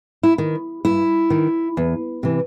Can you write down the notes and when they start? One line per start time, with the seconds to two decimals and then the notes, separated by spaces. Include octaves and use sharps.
0.23 E4
0.38 D#3
0.85 G2 E4
1.30 D#3
1.77 E2
2.23 C3 E3